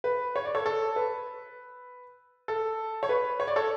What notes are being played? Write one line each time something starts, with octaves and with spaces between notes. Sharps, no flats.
B4
C#5
D5
A4 C#5
A4
B4
A4
C#5
B4
C#5
D5
A4 C#5